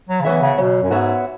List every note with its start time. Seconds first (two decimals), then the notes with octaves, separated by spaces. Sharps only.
0.09 F#3
0.21 C#3
0.25 E3 B3 F#4 C#5 E5
0.41 C#3
0.58 B2 F#3
0.82 F#2
0.91 G#2 B3 F#4 C#5 E5